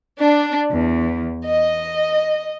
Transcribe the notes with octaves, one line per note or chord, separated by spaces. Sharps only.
D4
E2
D#5